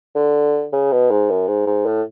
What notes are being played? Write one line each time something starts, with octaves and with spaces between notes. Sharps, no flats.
D3
C#3
B2
G#2
F#2
G#2
G#2
A2